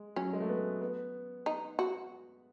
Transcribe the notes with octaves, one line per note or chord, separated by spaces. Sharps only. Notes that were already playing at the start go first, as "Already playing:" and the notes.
Already playing: G#3
F#3 C#4
G#3
A3
B3
B3
D#4
F#4